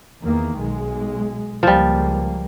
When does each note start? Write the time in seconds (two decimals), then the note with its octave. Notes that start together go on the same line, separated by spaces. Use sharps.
0.22 E2 D#3 A#3
0.58 B1 G#3
1.63 C#2 F3 G3 A#3